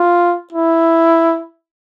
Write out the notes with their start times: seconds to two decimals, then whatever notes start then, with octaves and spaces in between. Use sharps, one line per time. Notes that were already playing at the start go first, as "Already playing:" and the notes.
Already playing: F4
0.53 E4